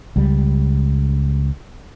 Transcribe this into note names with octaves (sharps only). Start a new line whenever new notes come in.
C#2 G3